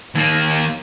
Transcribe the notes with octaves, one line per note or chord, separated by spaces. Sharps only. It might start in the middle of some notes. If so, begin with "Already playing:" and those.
D#2 A#3